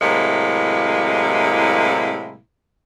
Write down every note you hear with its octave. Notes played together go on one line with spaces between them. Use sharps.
A2 C3 F#3 G#3 A#3 E4